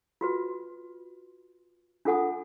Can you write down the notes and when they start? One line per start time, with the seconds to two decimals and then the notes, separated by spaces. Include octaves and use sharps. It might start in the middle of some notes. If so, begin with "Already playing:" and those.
0.21 F4 F#4 B4
2.05 D4 F4 A4 F#5 G#5 D#6